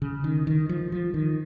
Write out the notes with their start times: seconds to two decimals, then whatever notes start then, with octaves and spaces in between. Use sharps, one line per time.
0.02 C#3
0.24 D#3
0.47 D#3
0.69 F3
0.92 F3
1.14 D#3